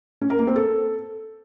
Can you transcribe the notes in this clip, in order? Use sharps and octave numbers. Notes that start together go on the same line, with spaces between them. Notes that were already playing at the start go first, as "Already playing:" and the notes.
C#4
A#4
A#3
C4
A4